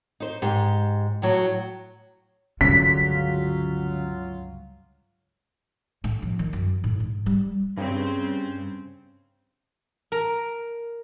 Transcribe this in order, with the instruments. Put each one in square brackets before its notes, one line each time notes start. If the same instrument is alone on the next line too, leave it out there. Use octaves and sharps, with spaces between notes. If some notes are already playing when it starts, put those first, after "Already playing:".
[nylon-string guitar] D#4 C5
G#2 G4
A2 F#3
[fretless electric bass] C#2 G2 [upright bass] D3 C#4 [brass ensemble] F#3 F4 [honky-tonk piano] B6
[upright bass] A2
F2
D#3
F#2
A2
G#2
G3
[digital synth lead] G2 [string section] C#3 C4
[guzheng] A#4